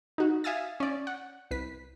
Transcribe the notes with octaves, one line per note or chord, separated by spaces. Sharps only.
D#4 F#4
E5 F5 G#5 D#6 E6 A6
C#4 D5
F#5
C2 B4 B6